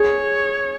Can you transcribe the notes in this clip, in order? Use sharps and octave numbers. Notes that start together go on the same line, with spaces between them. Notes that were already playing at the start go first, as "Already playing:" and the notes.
Already playing: G#4 C#5